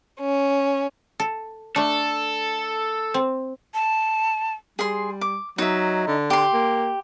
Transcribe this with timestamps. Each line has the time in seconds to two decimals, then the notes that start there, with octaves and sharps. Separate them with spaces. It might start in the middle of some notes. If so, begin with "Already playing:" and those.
0.20 C#4
1.20 A4
1.76 A3 D4 A4
3.14 C4
3.74 A5
4.79 G3 G#4 C6
5.21 D6
5.58 F#3 D#4 E5
6.07 D3
6.30 G4 C6
6.53 A#3